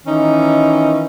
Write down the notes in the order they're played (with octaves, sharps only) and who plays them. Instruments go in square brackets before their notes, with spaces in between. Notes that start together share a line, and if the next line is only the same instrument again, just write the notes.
[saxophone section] D#3 E3 C#4 D#4